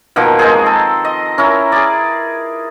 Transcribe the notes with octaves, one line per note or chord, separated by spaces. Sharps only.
B2 D#3 F3 A#3
G#3 C4 G#4
A4
D#5
C#4 E4 A#4
G#4 D5